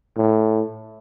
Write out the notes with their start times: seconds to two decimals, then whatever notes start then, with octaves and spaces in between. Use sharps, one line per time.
0.18 A2